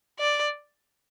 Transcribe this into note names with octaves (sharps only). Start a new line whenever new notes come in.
D5